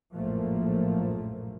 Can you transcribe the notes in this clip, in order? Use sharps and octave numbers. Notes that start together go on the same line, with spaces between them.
A#1 F#2 A2 F3 A3 A#3